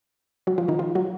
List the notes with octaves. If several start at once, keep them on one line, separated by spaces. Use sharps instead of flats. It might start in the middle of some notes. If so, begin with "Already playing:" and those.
F#3 F#4
F3 F4
D#3 D#4
F3 F4
F#3 F#4